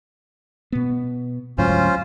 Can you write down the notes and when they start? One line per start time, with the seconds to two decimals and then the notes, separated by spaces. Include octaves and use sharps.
0.72 B2 B3
1.58 D2 G#2 F#3 C#4 F4 C5